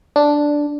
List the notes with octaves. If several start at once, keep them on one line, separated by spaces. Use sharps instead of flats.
D4